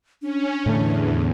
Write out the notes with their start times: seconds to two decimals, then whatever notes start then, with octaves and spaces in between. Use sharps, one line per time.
0.22 C#4 D4
0.66 E2 A2 D3 A3